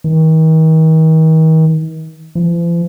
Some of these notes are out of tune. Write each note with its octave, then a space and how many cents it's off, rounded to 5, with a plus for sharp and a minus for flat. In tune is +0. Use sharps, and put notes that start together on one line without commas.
D#3 +40
F3 -45